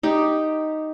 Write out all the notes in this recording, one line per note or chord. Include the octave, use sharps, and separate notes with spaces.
D#4 G4